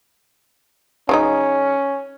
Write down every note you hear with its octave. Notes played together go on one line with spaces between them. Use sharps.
C#3 F#3 C#4 D#4